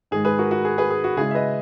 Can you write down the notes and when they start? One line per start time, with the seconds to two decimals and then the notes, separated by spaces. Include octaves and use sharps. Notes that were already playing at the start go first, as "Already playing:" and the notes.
0.11 G#2 D#3 G#3 G#4
0.25 G#4 B4
0.38 F#4 A#4
0.51 F#4
0.65 G#4
0.78 G#4 B4
0.90 G#4
1.04 F#4
1.17 C#3 G#3 C#4 E4 G#4
1.31 E5
1.35 B4 D#5